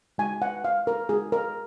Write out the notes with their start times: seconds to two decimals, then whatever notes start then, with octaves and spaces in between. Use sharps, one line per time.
0.18 G#3 D#4 F#4 G#5
0.42 F#5
0.64 F5
0.87 A#4
1.09 G#3 D#4 F#4 G#4
1.32 A#4